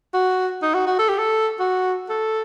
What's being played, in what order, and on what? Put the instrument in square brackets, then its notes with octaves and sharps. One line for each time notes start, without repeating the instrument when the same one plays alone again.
[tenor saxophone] F#4
D#4
F#4
F#4
A4
G4
A4
F#4
A4